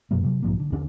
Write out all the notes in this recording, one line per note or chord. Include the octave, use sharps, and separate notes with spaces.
F#2 B2 F#3 A#3
C3 F#3
B1 G#2 F3 A#3
D3
D#2 D3 C#4 D4